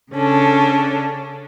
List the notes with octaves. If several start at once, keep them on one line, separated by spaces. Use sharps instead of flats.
C#3 C#4 D4 A4